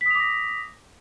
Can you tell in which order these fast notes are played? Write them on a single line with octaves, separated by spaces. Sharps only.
B6 D#6 F7 D6 A#6